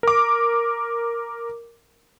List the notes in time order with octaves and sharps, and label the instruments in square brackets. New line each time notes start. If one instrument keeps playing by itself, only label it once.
[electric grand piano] A#4 D6